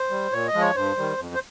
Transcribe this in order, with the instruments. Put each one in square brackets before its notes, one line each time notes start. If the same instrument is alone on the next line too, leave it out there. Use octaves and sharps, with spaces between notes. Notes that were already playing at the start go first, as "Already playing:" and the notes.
Already playing: [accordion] C5
G3
A#2 C#5
D#5
F3 G#3
C#5
G2 C5
D#3 G3
F2
C5